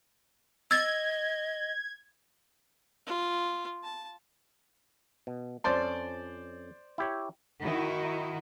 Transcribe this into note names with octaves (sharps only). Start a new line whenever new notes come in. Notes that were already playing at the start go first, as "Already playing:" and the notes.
D#5 E6 G#6 A6
F4
A5
B2
F2 C#4 C5 D5 A5 C6
E4 G4 C#5
D#3 D#4 E4 F#4